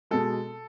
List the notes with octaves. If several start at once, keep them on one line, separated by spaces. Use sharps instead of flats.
B2 G#3 A4